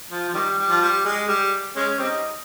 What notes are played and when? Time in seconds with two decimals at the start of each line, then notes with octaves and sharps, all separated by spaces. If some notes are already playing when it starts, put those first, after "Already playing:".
0.10 F3
0.28 F3
0.34 D#3 G3
0.58 G3
0.70 F3
0.81 G3
1.05 G#3
1.28 G3
1.76 G#3 C#4
1.99 G3 C4 D#4